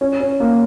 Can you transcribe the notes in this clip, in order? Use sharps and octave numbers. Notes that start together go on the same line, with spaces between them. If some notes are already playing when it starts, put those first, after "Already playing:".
C#4
C#4
A#3